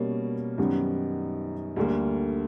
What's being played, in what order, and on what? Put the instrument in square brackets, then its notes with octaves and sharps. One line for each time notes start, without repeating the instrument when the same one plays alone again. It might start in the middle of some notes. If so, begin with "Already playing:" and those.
Already playing: [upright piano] B2 G3 A#3 C#4
F#2 D#3 G3 B3 D#4
D2 D3 G3 A#3